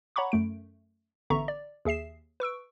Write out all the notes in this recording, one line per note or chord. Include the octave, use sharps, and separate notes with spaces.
C#5 F#5 A#5 B5 C#6 D6
F#2 A3 D7
A1 D3 B3 E5 A#5 C#6
D5
D#2 G#4 E5 C7 E7
B4 C#6 E6 D7